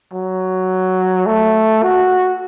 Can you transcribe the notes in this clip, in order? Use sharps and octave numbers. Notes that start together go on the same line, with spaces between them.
F#3
A3
F#4